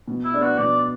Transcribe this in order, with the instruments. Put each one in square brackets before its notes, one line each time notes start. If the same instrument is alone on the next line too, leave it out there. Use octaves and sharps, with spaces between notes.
[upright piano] B2
[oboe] E4
[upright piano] B3 D4
[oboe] F#4
[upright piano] B2 [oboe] D5